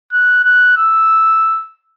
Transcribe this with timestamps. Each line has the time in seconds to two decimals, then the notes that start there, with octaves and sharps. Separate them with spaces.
0.13 F#6
0.44 F#6
0.77 E6